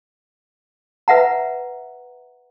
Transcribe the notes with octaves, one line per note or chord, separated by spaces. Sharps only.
B4 E5 F#5 A#5